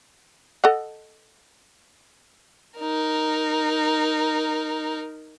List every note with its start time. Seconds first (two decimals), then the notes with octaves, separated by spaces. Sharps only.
0.64 A4 D#5 F#5
2.80 D#4 A#4